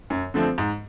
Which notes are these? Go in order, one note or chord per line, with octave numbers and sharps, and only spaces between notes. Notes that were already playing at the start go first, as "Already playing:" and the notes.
F#2
D3 F3 A3 C4
G#2